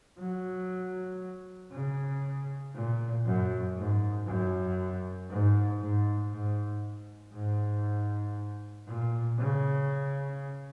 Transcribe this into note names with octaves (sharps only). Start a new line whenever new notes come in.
F#3
C#3
A#2
F#2
G#2
F#2
G#2
G#2
G#2
G#2
A#2
C#3